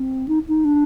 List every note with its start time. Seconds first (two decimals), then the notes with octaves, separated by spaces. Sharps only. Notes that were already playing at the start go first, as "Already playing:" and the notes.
Already playing: C4
0.28 D#4
0.48 D#4
0.65 D4